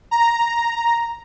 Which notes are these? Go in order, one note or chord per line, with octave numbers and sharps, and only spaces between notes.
A#5